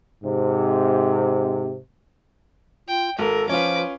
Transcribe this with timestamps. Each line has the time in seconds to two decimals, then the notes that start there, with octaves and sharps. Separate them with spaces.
0.24 G#2 C3
2.88 F4 G5
3.19 G#1 A4 A#4
3.49 F3 C#4 F4 B4 D6